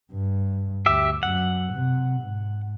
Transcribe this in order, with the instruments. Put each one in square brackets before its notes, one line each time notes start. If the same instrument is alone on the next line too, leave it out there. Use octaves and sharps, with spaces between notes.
[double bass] G2
[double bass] D2 [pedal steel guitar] G4 E5
[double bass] F#2 [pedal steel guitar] F#5
[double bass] C3
G#2